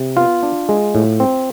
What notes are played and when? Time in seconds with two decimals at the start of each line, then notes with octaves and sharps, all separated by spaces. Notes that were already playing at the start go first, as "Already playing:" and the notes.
Already playing: C3
0.17 B3 F4
0.43 D4
0.69 G#3
0.95 A2
1.20 C4